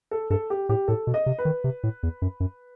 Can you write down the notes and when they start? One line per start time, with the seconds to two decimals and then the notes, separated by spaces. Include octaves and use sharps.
0.11 A4
0.30 G2 A4
0.50 G4
0.69 A2 G4
0.88 A2 A4
1.07 B2
1.14 D#5
1.26 C3
1.39 B4
1.45 D#3
1.64 C3
1.83 A2
2.03 E2
2.22 F#2
2.40 F#2